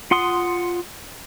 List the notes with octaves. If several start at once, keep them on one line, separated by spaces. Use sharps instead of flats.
F4 F#5 C6 D#6